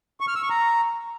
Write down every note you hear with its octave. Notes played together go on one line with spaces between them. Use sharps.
C#6
F6
E6
C#6
A#5